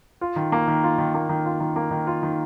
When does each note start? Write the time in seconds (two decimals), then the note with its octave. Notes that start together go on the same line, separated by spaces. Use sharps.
0.21 F4
0.36 D#3
0.52 A#3
0.68 D#3
0.84 F4
0.98 D#3
1.14 A#3
1.29 D#3
1.45 F4
1.60 D#3
1.76 A#3
1.91 D#3
2.07 F4
2.23 D#3